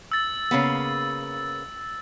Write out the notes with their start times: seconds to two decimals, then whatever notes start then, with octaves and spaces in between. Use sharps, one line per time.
0.12 E6 A6
0.51 C#3 A#3 B3